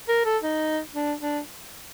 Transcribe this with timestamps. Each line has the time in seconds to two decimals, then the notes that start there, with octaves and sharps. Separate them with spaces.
0.09 A#4
0.26 A4
0.43 D#4
0.95 D4
1.21 D4